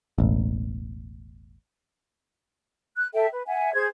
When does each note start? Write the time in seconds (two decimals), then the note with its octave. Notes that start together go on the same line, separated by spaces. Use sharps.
0.18 E1 A1
2.97 F#6
3.14 A4 E5 G5
3.32 B4
3.47 E5 F#5 G#5
3.74 G#4 C5 G#6